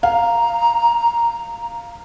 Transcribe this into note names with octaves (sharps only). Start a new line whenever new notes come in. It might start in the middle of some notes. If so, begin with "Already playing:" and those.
F5 A#5